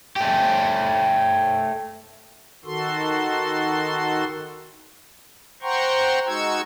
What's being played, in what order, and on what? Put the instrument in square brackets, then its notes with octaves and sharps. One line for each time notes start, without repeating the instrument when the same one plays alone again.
[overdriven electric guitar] A3 G4
[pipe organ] D#3 F#4 A4 C6
C5 F#5 G5 A#5 C6 C#6
G#3 D#4 F#4 C#6 E6 G#6